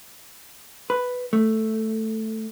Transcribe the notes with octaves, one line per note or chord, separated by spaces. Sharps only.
B4
A3